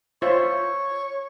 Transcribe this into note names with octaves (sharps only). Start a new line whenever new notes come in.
F4 C5 C#5 E5